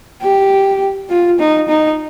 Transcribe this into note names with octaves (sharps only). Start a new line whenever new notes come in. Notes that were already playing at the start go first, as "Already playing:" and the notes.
G4
F4
D#4
D#4